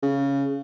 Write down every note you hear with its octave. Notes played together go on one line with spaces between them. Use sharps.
C#3